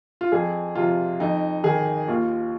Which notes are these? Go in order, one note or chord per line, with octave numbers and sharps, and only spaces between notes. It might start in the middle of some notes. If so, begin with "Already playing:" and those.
F4
F2 G#4
C3 F3 F4
F2 D#4
D#3 G#4
D#2 F4